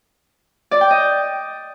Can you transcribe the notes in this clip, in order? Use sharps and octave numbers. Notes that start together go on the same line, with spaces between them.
D5
G5
D#5